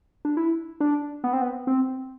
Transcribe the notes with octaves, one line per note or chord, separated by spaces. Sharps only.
D4
E4
D4
B3
C4
B3
C4